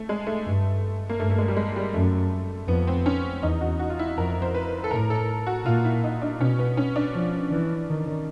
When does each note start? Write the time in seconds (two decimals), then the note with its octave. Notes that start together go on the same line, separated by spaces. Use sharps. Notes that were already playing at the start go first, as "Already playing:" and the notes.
Already playing: A3
0.09 G#3
0.27 A3
0.46 G2
1.09 A#3
1.20 G2 A3
1.30 A3
1.38 G#3
1.48 G3
1.57 G#3
1.76 G3
1.94 F#2 A3
2.68 F2 B3
2.87 C4
3.06 C#4
3.43 E2 D#4
3.61 F#4
3.79 F#4
3.90 F4
3.99 E4
4.17 F2 A#4
4.42 C5
4.54 B4
4.84 A4
4.91 A2 A#4
5.10 A4
5.47 F#4
5.65 A#2 F4
5.85 E4
6.03 D#4
6.22 D4
6.40 B2 C#4
6.59 B3
6.77 C#4
6.96 D4
7.15 F3
7.51 E3
7.89 D#3